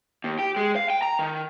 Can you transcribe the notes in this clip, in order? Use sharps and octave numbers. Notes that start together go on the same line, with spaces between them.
D#2
G4
G#3
F5
G5
A#5
D#3